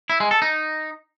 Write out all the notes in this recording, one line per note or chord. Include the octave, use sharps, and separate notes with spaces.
E4
G#3
A4
D#4